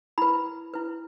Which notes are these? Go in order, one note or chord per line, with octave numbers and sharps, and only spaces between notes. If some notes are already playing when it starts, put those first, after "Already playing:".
E4 B4 B5
E4 B4